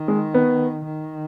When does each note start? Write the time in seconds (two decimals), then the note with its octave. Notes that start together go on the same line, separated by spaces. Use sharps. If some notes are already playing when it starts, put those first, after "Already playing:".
Already playing: D#3
0.08 G#3
0.34 B3
0.85 D#3